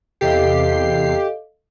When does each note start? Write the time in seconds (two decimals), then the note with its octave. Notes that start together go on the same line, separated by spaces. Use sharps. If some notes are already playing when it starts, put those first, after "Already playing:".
0.21 E2 C3 G4 A4 D#5 F5 C7